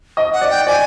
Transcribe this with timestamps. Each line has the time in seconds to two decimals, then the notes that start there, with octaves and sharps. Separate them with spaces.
0.17 D#5
0.33 F#5
0.41 D5
0.50 G5
0.67 D5 G#5